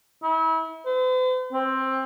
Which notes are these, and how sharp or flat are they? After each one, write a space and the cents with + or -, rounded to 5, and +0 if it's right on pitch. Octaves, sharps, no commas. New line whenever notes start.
E4 -35
C5 -45
C4 +15